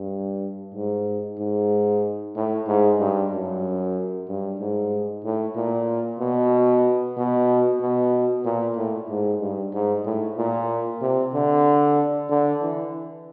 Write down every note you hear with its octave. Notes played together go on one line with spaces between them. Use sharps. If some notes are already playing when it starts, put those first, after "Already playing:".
Already playing: G2
G#2
G#2
A2
G#2
G2
F#2
G2
G#2
A2
A#2
B2
B2
B2
A#2
A2
G#2
G2
G#2
A2
A#2
C3
D3
D3
E3